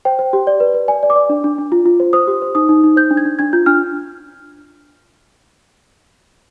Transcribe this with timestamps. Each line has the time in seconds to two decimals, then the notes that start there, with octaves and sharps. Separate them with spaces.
0.05 C5 G5
0.19 C5
0.33 G4
0.47 D5
0.60 B4
0.74 B4
0.88 D5 G#5
1.03 D5
1.10 D6
1.16 D5
1.29 D4
1.44 D4
1.58 D4
1.72 F4
1.86 F4
2.00 C5
2.13 C5 D#6
2.27 G4
2.42 C5
2.55 D#4 D#6
2.69 D#4
2.84 D#4
2.96 C5 G6
3.11 D4
3.17 G#6
3.25 D4
3.39 D4 G#6
3.53 F4 G6
3.66 D4 F6